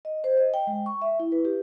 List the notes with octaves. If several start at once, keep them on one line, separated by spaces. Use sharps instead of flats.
D#5
C5
D#5
G5
G#3
C#6
E5
E4
B4
G4